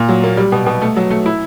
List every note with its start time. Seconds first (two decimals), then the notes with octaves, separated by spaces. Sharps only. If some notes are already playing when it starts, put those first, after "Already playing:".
Already playing: A#2
0.09 F#3
0.23 A#3
0.37 G3
0.52 B2
0.66 B2
0.82 A3
0.96 F#3
1.11 A3
1.26 E4